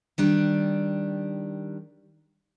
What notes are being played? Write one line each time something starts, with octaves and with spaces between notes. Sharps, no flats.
D#3 G3 D4